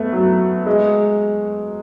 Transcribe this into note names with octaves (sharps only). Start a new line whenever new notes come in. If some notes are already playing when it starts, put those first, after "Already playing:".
Already playing: A3 B3
F#3
G#3